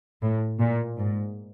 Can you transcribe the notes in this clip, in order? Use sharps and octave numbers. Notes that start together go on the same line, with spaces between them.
A2
A#2
G#2